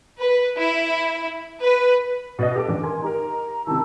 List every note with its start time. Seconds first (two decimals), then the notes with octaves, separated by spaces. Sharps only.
0.19 B4
0.57 E4
1.61 B4
2.39 B2 B4 D#5
2.56 G4 A4 D6
2.69 E2 A#2 D3
2.83 A#4 G#5 C6
3.02 D#4 G4 A#4 A#5
3.67 C3 D#3 E4 A5 E6